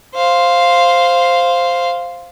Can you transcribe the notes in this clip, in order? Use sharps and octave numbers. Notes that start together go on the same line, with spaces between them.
C5 F5